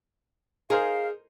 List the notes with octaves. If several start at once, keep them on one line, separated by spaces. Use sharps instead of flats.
D#4 G#4 A#4 C5 F5